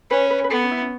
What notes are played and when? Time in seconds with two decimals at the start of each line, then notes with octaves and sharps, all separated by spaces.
0.11 C#4 B4
0.30 B4
0.44 B4
0.50 B3 A4
0.64 C#4
0.71 E4
0.81 C#4